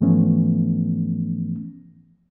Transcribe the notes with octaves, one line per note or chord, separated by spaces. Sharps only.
G#2 E3 F3 A3 B3 C#4